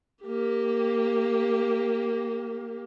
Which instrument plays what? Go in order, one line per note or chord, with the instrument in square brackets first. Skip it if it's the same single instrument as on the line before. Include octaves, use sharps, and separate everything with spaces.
[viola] A#3 G4